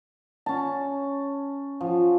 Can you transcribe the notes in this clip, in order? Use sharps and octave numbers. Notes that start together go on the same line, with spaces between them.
C#4 A5
F3